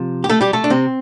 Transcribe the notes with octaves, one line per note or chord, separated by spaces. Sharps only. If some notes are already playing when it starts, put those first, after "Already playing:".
Already playing: C3 F3
G4
A3 A4
G3 G4
A3 A4
D4
C3 C4